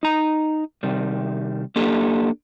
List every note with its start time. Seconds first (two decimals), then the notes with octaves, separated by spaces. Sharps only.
0.03 D#4 A#5
0.83 C3 D#3 G3
1.76 A#3 D4 G4 A4